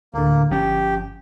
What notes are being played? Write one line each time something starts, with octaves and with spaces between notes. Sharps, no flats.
D2 A2 D3 A#3
G1 F3 C#4 G4